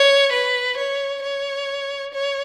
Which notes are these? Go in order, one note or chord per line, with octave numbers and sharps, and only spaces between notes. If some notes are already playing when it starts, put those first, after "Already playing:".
Already playing: C#5
B4
C#5
C#5
C#5